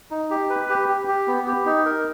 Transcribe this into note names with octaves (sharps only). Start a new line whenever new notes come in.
D#4
G4
B4
G4
G4
G4
B3
G4
D#4
A#4